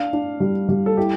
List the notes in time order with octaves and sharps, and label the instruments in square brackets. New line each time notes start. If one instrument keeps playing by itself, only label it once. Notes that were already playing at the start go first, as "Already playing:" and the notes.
Already playing: [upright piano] D4 [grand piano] F5
[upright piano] D4
G3
G3
[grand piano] A4
[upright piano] E4 [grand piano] G4